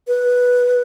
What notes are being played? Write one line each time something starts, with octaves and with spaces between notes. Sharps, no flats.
B4